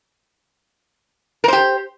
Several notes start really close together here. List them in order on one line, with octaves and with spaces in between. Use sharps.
A#4 C5 G4